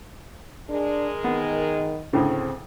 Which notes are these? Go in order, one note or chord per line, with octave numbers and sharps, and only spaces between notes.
G#3 D4 G#4 A#4
D#3 B3
D2 A2 C#3 C4